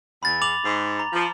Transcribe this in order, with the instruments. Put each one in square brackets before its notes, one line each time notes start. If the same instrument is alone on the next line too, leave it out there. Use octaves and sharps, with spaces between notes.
[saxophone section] E2 [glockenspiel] B5 A6
[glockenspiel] D6 F7 F#7
[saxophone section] G#2
[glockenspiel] A#5
[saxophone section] F3